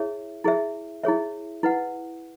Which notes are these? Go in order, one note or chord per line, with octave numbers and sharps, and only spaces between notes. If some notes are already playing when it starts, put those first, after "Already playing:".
Already playing: E4 G#4 C#5 E5
E4 G#4 C#5 E5
E4 G#4 C#5 E5
E4 B4 F#5